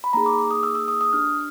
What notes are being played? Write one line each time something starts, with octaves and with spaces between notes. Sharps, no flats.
B5
A#3 D#4 G#4 A#5
D6
D6
D#6
E6
E6
D#6
D#6
D4 G4 F6